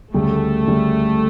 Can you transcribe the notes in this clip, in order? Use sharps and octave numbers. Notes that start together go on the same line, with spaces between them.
D2 C#3 G3 A3
D2 C#3 G3